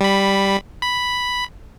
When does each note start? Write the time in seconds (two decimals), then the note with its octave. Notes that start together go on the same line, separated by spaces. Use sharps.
0.01 G3 B5
0.82 B5